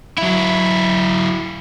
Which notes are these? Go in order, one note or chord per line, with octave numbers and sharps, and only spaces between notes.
F#3 E4